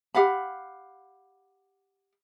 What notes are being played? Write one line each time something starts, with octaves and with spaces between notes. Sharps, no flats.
G4 F5 F#5 B5